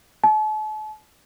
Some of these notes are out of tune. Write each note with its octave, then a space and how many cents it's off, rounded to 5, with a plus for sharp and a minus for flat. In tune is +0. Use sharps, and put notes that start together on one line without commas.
A5 -40